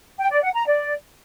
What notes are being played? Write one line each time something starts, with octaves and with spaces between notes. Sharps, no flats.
G5
D5
F#5
A#5
D5